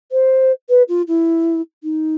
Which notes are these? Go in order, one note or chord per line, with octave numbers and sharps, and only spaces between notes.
C5
B4
F4
E4
D#4